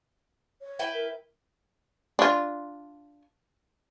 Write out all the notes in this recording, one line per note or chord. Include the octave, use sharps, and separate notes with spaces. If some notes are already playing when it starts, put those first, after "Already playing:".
C#5
E4 B4 G5
A#4
D4 F4